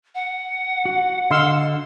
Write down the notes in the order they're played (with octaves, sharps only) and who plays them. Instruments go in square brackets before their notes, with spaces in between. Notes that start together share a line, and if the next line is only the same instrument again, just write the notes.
[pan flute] F#5
[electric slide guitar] F#4
[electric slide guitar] D3 [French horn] D#5 [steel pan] F5 C6 E6